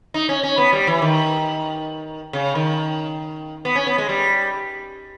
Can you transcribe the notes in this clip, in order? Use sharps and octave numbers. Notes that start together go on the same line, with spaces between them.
D#4
C#4
C#4
B3
G3
E3
D#3
C#3
D#3
B3
C#4
B3
G#3
G3